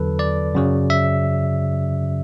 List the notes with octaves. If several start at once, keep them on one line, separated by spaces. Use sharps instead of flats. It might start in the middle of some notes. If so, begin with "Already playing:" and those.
Already playing: E2 D3 F#3 A4 B4
D5
F#2 C#3 F#3
E5